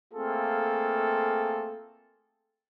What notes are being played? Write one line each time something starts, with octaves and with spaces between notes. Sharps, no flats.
A3 A#3 C4 F4 G#4 A4